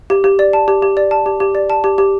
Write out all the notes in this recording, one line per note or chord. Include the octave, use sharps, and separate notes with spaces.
G4
G4
D5
A5
G4
G4
D5
A5
G4
G4
D5
A5
G4
G4